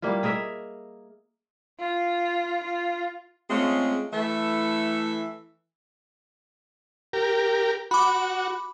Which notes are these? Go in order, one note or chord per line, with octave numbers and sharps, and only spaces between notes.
G3 A#3 E4 F4
G#4 A#4 D#5 E5
F4
F4
G#3 A3 C4 C#4 F4 G#4
E3 A3 E4 A4 E5
G4 A#4
F#4 B5 D6